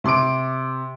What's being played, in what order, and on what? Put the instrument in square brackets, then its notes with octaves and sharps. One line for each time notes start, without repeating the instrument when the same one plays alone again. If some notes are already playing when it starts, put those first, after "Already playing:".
[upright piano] C3 C6 D6 D7